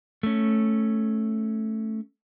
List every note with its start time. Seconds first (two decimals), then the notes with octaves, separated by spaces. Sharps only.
0.23 A3 C#4